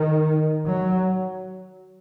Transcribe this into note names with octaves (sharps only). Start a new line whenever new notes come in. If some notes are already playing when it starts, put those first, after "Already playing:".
Already playing: D#3
F#3